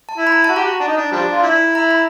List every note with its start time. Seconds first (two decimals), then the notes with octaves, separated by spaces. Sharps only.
0.09 A5
0.17 E4
0.27 B5
0.32 A#5
0.44 F#4 A5
0.56 G4 A#5
0.64 F#4
0.80 D4
0.88 D#4
0.97 D4
1.12 F3 G3 D4
1.31 F4
1.43 E4
1.75 E4 A#5
1.90 B5